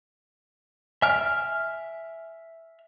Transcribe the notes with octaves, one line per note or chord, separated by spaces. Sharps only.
E5 G#5 F6